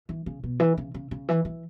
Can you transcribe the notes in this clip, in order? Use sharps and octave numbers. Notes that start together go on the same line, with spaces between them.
E3
C#3
B2
E3
C#3
C#3
C#3
E3
E3